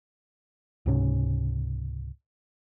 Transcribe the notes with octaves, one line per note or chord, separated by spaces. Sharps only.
C#2 G#2 C3 C#4